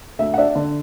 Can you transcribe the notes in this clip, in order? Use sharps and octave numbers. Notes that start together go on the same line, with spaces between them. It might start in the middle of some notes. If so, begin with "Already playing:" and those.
D2 E5
F#5
D4 E5
D3